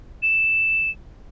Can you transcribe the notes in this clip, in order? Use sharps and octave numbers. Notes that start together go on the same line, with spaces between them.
E7